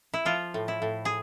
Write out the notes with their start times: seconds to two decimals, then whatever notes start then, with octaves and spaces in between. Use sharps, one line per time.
0.14 E4
0.25 F3 F4
0.54 A2
0.68 E4
0.82 A2
1.05 G#4